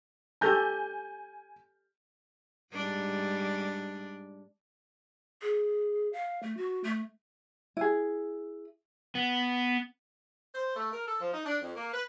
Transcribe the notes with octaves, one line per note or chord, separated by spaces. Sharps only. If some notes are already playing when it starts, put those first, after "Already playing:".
G4 A4 G#5 A#5 G6
G#2 G3 D4
G#4
F5
A3
F#4
A3
E4 G#4
B3
C5
A3
A#4
A4
F3
D#4
D4
F2
A#3
B4